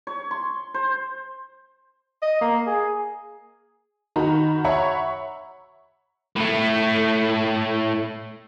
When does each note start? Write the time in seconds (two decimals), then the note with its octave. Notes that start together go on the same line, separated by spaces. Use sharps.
0.07 C#5
0.31 C6
0.74 C5
2.22 D#5
2.41 A#3
2.67 G#4
4.16 D#3 F#4 A#5 B5
4.64 C#5 E5 F#5 A#5 B5 C#6
6.36 A2 A3